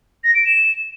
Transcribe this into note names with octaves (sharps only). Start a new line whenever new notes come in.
A#6
D7
E7